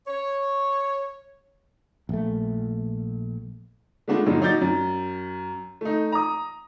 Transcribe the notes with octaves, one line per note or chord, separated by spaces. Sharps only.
C#5
A#1 A3
G#3 A3 B3 D4 F4
G2 A#2 D3 F#3 D#4
F#3 D#4 D5 G6 A6
F#2
A3 D#4
A#5 D#6